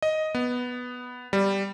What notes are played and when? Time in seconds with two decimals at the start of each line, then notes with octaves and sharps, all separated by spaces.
0.02 D#5
0.35 B3
1.33 G3